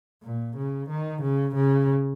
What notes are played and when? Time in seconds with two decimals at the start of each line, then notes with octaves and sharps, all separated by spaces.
0.23 A#2
0.56 C#3
0.89 D#3
1.22 C#3
1.55 C#3